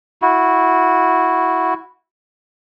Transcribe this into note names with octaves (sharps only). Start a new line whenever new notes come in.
E4 F#4